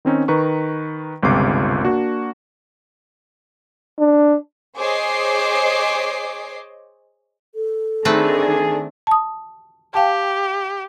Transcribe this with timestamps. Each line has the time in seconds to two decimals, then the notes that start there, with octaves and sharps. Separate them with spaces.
0.05 D#3 C4 C#4 D#4
0.28 D#3 B4 A#5 C#6
1.23 G1 C#2 C3 D6 C7
1.83 A#3 D4 F#4
3.99 D4
4.77 G#4 C5 C#5 D#5 D6 C7
7.55 A4
8.05 D#3 A3 C4 D4 G#4 B4
9.07 A5 D#6
9.94 G4 F5 G5 A5